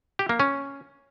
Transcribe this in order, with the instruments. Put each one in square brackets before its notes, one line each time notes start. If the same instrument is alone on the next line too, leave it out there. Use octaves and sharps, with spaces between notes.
[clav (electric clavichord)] G4
A#3
C#4